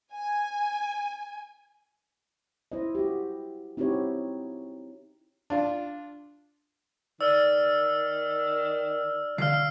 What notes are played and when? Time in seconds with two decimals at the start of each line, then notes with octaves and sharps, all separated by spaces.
0.13 G#5
2.72 E4 C5 D#5
2.95 F#4 G4
3.77 C4 D#4 E4 F#4 G4 C#5
5.50 D4 F4
7.21 D#3 D5 E6 F6
9.38 D3 F5 F6 C7